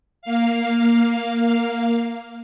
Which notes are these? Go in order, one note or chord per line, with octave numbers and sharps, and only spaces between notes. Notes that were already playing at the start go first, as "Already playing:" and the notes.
A#3 F5